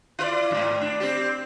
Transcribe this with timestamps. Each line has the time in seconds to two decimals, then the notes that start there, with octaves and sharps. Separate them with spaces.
0.19 E4 B4 D5
0.51 F2 G#2
0.81 D4
1.00 C4 G4